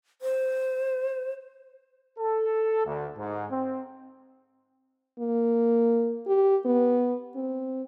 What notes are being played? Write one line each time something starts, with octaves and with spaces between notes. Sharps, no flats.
C5
A4
D2
G#2
C4
A#3
G4
B3
C4